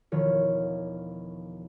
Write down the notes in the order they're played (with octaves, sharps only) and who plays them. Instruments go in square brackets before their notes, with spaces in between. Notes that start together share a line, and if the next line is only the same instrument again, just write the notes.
[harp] E1 D#3 F3 C#5 F6